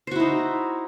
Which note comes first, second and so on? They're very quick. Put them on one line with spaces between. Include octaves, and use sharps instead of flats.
C5 F#4 E4 D#4